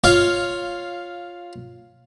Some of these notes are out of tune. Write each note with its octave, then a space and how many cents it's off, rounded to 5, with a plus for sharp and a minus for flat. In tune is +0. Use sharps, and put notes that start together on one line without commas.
F4 +5 C#5 +0 F5 -5